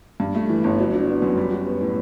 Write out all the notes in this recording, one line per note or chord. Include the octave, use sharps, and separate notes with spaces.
G2
A3
E3
G1
F#3
D4
B3
F#2
G3
F#4
B3
A2